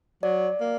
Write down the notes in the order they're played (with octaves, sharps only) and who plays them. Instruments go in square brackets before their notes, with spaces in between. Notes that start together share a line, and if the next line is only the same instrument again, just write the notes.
[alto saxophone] F#3 [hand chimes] D5
[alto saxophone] A#3